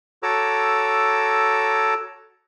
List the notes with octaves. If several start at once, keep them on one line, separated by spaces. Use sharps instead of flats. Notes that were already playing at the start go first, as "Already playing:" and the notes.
F#4 A4 C#5 A#5 D6 E6